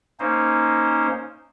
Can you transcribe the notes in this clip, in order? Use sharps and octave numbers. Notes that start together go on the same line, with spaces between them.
A#3 C#4 D#4 C5